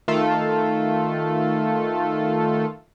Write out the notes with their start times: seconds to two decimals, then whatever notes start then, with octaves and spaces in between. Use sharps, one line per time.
0.08 D#3 A3 F4 A4